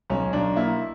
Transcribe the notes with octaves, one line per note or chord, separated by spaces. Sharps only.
B1 C#4
B1 D4
A#3 E4